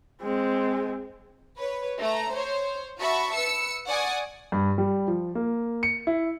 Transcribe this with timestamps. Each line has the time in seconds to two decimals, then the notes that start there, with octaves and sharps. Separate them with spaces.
0.21 G#3 C4
1.57 B4 C#5
1.99 A3 A#5
2.32 C5 C#5
2.98 F#4 E5 A5 B5 C#6
3.34 B4 E6 C#7
3.87 D5 F#5 G#5 C#6 D#6
4.52 G2
4.78 G3
5.08 F3
5.35 A#3
5.83 C#7
6.07 E4